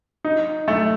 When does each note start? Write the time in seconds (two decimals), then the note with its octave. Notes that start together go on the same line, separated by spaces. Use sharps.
0.25 D#4
0.68 A3